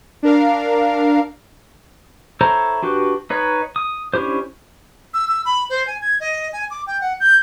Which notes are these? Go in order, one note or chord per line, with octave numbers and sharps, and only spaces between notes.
D4 A#4 F5
E4 A4 C5 C#5 A#5
D4 F#4 G4 B4
D#4 B4 C#5
D#6
C#4 D4 E4 G4 C5
E6
E6
B5
C5
G#5
G#6
D#5
G#5
D6
G5
F#5
G6